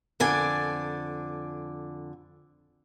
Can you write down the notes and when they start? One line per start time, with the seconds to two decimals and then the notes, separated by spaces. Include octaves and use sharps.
0.20 F2 D3 D5 G#5